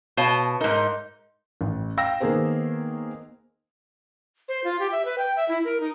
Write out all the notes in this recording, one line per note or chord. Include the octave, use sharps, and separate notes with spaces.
B2 C#5 F5 A5
G#2 D#4 A#4
A1
F5 G5 E6 A#6
D#3 A#3 B3 G#4 A#4 C5
C5
F4
G4
E5
B4
G5
E5
E4
A#4
D#4